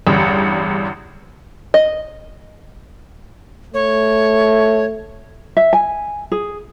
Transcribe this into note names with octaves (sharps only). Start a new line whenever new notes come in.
A1 E2 G2 D3
D#5
A3 C#5
E5
G#5
G#4